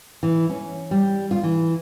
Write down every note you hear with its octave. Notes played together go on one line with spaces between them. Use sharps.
E3
C#4
G3
F4
E3